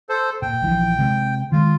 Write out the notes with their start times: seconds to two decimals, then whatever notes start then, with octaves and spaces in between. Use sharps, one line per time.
0.09 A4 C5
0.42 A#2 G5
0.62 A#1 E3 F3
0.99 C3 G#3 C4
1.52 D#3 G#3 F4